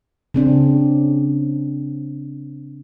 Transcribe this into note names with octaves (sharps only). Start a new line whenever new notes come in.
C#3 C4 D4